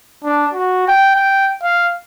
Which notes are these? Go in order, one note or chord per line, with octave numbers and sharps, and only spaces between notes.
D4
F#4
G5
G5
F5